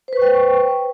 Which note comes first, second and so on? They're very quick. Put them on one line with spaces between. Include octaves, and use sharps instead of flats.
C5 B4 C#6 G5